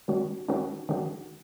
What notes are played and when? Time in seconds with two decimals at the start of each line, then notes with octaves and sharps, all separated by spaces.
0.08 D#3 G#3 C#4 F#4
0.49 D#3 G#3 C#4 F#4
0.89 D#3 G#3 C#4 F#4